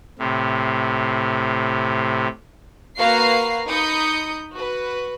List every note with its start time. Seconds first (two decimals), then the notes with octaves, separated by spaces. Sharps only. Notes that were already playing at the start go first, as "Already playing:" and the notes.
0.19 A2 C3
2.98 A#3 F#4 B4 F5 A#5 C7
3.67 D#4 A#5 B5 D#6 G6 C#7
4.51 F#4 B4